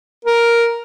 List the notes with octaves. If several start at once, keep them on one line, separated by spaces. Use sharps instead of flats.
A#4